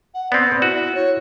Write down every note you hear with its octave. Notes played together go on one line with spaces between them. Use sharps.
F#5
B3 C4 D5
E4 F#4
C#5